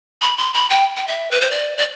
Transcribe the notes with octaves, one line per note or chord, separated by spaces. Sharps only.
B5
C6
B5
G5
G5
E5
B4
C5
D5
D5